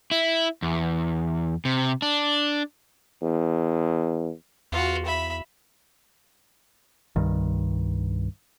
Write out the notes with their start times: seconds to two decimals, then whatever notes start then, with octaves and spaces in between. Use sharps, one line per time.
0.11 E4
0.62 E2
1.65 C3
2.02 D4
3.22 E2
4.72 E2 F4 F#4
5.06 E5 B5
7.16 C2 G2 D#3